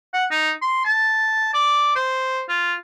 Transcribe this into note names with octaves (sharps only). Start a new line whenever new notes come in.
F#5
D#4
C6
A5
D5
C5
F4